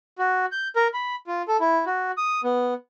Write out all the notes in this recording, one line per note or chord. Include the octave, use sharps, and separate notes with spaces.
F#4
G6
A#4
B5
F4
A4
E4
F#4
D#6
B3